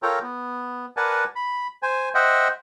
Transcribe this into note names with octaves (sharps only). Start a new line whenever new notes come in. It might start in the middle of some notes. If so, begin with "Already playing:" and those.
F4 A4 A#4 C#5 G5 A#5
B3
A#4 B4 D5 F#5 G#5 A5
B5
C5 G#5
C5 D#5 E5 F#5 G5